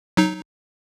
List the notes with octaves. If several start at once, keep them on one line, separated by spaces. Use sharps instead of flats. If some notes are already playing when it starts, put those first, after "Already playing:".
F#3 D#4